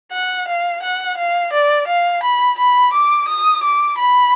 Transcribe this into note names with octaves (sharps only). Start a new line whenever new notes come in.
F#5
F5
F#5
F5
D5
F5
B5
B5
D6
D#6
D6
B5